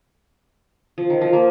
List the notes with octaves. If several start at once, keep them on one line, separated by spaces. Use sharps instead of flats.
F3
D#3
F3
A#3